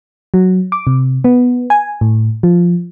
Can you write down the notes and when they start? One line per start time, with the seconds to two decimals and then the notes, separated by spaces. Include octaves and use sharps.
0.34 F#3
0.72 D6
0.87 C3
1.24 B3
1.70 G#5
2.01 A2
2.43 F3